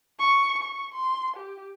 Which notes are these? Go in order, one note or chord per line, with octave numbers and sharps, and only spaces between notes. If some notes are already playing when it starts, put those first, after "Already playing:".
C#6
C#6
C6
G4